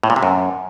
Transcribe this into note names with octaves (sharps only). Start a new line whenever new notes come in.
A2
A#2
C3
F#2